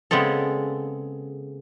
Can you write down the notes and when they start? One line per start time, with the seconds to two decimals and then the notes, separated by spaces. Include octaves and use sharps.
0.11 C#3 G#3 B3 C4 A4